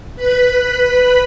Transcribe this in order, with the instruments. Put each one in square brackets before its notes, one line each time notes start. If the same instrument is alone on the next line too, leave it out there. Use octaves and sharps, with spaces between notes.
[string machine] B4 B5